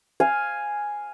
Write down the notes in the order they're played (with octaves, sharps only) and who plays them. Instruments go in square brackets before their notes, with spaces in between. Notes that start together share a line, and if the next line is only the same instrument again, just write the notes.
[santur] F5 G#5